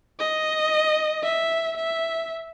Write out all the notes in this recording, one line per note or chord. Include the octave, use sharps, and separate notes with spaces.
D#5
E5
E5